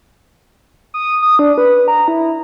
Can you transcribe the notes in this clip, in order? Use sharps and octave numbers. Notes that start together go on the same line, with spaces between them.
D#6
D#6
D4
B4
A#5
E4